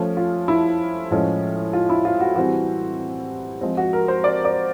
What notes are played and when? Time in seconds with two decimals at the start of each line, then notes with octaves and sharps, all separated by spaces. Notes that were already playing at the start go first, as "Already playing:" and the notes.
Already playing: F3 A3 C#4
0.17 F4
0.48 E4
1.11 A2 F3 G#3 C#4
1.73 F4
1.90 E4
2.05 F4
2.21 F#4
2.36 E3 G3 C4 F#4
3.61 F3 G#3 C4
3.77 F#4
3.93 A#4
4.08 C5
4.24 D5
4.45 D5